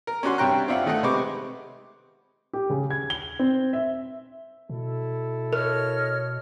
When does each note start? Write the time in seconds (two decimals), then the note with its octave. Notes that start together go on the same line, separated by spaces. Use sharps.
0.07 A#4
0.23 C#4 D4 F#4 C6
0.38 G2 C3 C#5 G5 A#5 F#6
0.68 C4 D4 F4 E5 F#5
0.86 D#3 A3 D#4 D#5 F#5
1.03 C3 G#3 B4 C5 C#6 D6
2.53 G4
2.70 C#3
2.90 G#6
3.10 G7
3.39 C4
3.73 E5
4.70 B2 E4 A4
5.53 A#4 C#5 D#5 F6